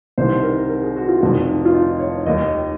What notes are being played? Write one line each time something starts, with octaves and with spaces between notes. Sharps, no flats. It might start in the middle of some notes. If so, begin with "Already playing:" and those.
C2 C3 D#3 C5
A#4
A#4
G#4
F#4
F4
F1 F2 D#3
F4
D#4
C#5
D#2 D#3 D#5